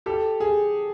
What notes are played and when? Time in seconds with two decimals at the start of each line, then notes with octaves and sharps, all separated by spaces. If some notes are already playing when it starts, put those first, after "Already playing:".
0.06 G4 A4
0.40 G#4